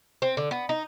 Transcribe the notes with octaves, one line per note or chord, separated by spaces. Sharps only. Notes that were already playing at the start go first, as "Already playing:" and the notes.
C4
D3
B3
D#4